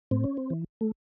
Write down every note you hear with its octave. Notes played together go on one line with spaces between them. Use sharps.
A2 C4
C#4
C4
E3
A3